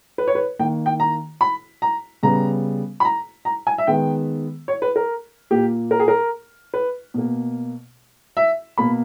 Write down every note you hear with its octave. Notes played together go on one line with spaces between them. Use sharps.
B4
C#5
B4
D#3 A#3 G5
G5
A#5
B5
A#5
C#3 G3 B3 A#5
B5
A#5
A#5
G#5
E5
D#3 G#3 B3 G5
C#5
B4
A#4
A#2 A#3 G4
A#4
G#4
A#4
B4
B2 A#3
E5
B2 A#3 B5